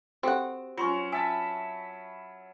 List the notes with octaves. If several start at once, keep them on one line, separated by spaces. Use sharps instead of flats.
C4 F#4 G4 A4 F#5
F#3 C#4 F4 C6 C#6
E5 G#5 A5 B5